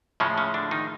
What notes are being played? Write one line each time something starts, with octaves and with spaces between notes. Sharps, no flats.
A2 C#3 F3 G#3 C#4
C#3 C#4
D3 D4
D#3 D#4